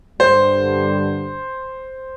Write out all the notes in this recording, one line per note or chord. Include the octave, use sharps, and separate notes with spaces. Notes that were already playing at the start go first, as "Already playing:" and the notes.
G2 D3 G3 C5